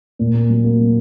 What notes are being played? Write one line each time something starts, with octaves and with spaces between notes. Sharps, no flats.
A#2
A#3
F#3
A#3
F#3